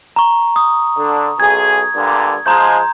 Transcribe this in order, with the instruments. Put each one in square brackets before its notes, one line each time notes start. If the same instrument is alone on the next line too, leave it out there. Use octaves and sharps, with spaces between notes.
[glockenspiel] A#5 C#6
D#6
[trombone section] D3
[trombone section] B1 G#4 [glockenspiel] G#6
[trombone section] G2 A#2 D3
[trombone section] F3 G#3 [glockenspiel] A#5 C6 G6